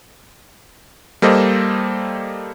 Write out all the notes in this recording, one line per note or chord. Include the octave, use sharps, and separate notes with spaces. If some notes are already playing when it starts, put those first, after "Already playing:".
G3 A#3 A4 C5 D#5